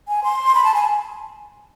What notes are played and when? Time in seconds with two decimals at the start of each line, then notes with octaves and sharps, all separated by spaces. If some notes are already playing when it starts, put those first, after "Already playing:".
0.08 G#5
0.24 C6
0.55 B5
0.64 A5
0.74 G#5